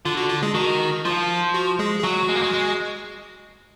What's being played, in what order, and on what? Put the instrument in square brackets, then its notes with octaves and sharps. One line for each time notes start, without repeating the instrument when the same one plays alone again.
[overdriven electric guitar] D3 [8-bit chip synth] F4
[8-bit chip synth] F#4
F4
G#3 G#4
[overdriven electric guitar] D#3 [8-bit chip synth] F#4
[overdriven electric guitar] F3 [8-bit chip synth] F4
[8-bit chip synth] F#4
G#3 G#4
G#4
[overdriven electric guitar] F#3 [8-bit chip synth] F#4
[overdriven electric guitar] G#3
A#3
G#3
G#3